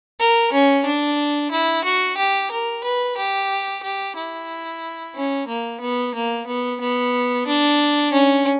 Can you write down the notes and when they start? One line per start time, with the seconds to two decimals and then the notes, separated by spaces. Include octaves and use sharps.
0.20 A#4
0.53 C#4
0.85 D4
1.51 E4
1.85 F#4
2.17 G4
2.51 A#4
2.84 B4
3.17 G4
3.83 G4
4.17 E4
5.15 C#4
5.48 A#3
5.81 B3
6.15 A#3
6.47 B3
6.80 B3
7.47 D4
8.12 C#4